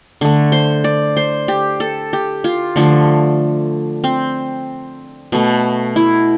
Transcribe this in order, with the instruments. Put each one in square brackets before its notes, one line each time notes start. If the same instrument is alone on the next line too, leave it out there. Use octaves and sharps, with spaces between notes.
[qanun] D3 A3
C5
D5
C5
G4
A4
G4
F4
D3 F3 A3
C4
B2 A3
E4